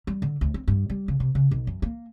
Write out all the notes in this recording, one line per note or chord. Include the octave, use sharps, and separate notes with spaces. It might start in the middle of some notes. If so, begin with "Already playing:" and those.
G3
D3
D2
C4
G2
G3
C#3
C3
C#3
B1
F#2
A#3